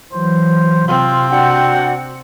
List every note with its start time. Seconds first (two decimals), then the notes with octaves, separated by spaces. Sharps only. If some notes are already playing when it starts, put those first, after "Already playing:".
0.13 E3 F#3 C5
0.88 C3 C4 F4
1.31 D4 F#4 F#5 G5